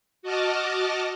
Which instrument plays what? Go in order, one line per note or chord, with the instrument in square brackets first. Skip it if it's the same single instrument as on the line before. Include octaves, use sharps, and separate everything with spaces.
[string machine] F#4 D#5 A5 D6 F6